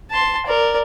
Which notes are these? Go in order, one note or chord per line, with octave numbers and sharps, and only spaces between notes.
A5 C6
A#4 D5